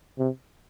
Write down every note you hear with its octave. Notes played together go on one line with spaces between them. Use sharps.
C3